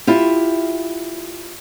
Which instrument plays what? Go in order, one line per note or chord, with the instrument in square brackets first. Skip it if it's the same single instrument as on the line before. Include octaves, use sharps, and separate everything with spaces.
[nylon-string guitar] E4 F4 G4